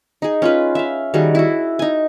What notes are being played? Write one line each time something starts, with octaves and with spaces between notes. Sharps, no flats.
D#4 G#4
C#4 F4 B4
E5 F5
D#3 G3 F#4 G#4
E4 F#4
D#4 G#5